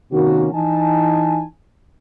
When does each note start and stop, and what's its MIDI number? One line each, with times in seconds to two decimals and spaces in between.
0.12 0.47 48
0.12 0.47 51
0.12 0.47 58
0.12 0.47 61
0.12 0.47 66
0.52 1.43 52
0.52 1.43 63
0.52 1.43 80
0.52 1.43 81